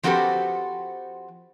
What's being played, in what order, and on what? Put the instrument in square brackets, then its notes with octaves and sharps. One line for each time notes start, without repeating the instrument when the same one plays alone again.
[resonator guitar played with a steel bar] F3 C4 F#4 G4 A4 B4